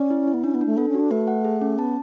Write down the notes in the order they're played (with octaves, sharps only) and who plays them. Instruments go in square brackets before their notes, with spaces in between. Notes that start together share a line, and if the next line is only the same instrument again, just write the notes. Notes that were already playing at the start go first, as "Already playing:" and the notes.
Already playing: [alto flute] C#4 [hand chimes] D5
[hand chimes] E4
E4
[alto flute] B3
[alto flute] C#4 [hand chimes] D4
[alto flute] B3
[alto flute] A3 [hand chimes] D4
[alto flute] B3 [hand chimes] A4
[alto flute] C#4
[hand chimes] F#4
[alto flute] D4
[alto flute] A3 [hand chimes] B4
[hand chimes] F#5
G#4
C#4
[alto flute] B3 [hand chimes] A5